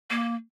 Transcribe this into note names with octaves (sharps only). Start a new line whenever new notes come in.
A#3